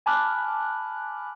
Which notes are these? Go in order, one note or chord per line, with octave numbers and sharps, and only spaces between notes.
G#5 A5 B5 D6 F6 F#6